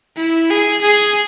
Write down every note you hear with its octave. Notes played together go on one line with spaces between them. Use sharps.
E4
G#4
G#4